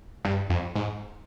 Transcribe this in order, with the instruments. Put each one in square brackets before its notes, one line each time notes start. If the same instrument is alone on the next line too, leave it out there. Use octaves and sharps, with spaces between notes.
[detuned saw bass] G2
F2
G#2